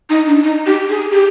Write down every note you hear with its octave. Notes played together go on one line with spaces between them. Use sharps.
D#4
D4
D#4
G4
G#4
G4